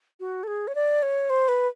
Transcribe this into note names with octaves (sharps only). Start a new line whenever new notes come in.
F#4
A4
G#4
C#5
D5
C#5
C5
B4